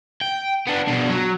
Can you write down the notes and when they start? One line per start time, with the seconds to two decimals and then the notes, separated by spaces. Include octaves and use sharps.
0.21 G5
0.67 B3 D4
0.88 B2 D4
1.09 F#3